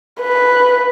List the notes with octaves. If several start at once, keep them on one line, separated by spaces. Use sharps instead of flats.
B4